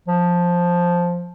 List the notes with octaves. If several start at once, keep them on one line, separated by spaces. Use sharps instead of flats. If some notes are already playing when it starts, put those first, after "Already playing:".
F3